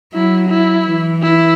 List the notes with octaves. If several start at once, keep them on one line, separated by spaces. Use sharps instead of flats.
F#3 E4
E4
E3
E4